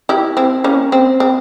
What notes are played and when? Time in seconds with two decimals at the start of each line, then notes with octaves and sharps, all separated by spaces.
0.09 E4 G4
0.37 C4 E4
0.64 A#3 C#4
0.92 C4
1.20 C4